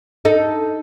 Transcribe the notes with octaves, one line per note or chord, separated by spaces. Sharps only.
D#4 A4